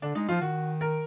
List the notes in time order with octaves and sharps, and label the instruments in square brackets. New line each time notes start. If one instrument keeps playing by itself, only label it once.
[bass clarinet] D3 [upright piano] D4
[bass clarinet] G#3 [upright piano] D#4
[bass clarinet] F3 [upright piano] F4
[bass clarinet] D#3 [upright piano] F#4
[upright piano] A#4